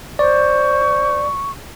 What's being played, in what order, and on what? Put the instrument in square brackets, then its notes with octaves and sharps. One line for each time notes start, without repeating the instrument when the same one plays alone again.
[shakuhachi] C5 [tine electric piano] D5 [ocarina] C#6